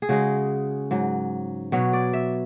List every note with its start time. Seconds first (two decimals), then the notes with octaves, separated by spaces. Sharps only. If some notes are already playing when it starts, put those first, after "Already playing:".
0.02 G#4
0.09 C#3 G#3 F#4
0.91 G#2 F#3
1.72 B2 F#3 C#5
1.93 D5
2.13 E5